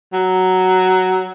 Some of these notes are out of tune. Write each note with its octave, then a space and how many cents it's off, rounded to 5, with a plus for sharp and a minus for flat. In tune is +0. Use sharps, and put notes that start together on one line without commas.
F#3 +5